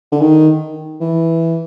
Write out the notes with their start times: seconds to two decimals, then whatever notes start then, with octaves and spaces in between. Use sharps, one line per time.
0.12 D3
0.21 D#3
1.01 E3